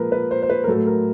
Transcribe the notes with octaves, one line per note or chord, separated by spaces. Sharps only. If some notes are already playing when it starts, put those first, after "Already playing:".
Already playing: A#2 F3 G#3 A#4 B4
B4
C5
C5
B4
A#4
A2 F#3 A4
A#4